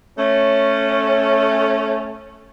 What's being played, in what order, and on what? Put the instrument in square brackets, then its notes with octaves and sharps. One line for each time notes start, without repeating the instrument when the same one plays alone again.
[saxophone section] A3 C#4